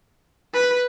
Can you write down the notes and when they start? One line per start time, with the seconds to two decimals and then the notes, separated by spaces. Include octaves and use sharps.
0.54 B4